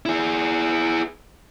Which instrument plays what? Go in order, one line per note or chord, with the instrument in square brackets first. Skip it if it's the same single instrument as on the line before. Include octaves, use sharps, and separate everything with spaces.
[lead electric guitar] E4 G#4